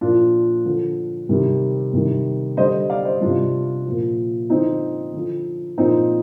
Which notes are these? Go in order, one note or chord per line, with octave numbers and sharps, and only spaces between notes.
A#2 F3 D4 F4
D3 F3
C3 D#3 G3
C3 D#3 G3
D3 G3 C5 D#5
D5 F5
C5 D#5
C3 G3 D4 F4
A#2 F3
D3 F3 C4 D#4
D3 F3
A#2 F3 C4 D#4